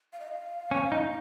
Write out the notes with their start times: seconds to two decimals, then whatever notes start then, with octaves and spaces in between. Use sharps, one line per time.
0.13 F5
0.20 D#5
0.28 F5
0.71 C#4
0.92 D#4